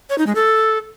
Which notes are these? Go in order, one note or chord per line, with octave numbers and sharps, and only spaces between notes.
C#5
D#4
G#3
A4